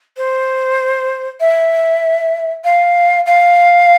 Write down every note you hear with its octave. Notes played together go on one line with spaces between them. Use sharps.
C5
E5
F5
F5